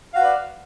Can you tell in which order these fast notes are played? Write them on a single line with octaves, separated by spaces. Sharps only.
F5 F#4 B4 D5